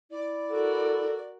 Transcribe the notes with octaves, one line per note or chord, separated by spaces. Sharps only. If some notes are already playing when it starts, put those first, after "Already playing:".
E4 D5
F#4 A4 A#4